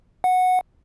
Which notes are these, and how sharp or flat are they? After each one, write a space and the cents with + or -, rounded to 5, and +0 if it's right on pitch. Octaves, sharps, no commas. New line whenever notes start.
F#5 -10